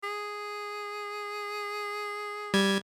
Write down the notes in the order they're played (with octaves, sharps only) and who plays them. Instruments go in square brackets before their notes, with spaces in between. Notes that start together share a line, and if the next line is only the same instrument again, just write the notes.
[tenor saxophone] G#4
[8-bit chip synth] G3 G#6